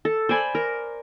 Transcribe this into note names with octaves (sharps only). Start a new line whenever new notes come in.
A4
C5 D5 G#5 B5
A#4